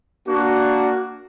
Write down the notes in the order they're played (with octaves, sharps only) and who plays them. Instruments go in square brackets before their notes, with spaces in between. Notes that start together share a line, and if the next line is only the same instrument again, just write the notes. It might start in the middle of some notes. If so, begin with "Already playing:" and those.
[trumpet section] A#3 D4 F#4